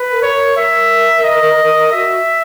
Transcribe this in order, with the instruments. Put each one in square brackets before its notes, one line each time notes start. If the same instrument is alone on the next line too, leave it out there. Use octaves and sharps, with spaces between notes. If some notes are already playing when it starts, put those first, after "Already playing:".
Already playing: [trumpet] B4
[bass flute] A#4
[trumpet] C#5
[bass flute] A#4
[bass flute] A#4 [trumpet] E5
[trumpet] D#5
[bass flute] F#4 [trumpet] E5